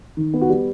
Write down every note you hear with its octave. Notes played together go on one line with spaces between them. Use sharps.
D#3
B3
F#4
G3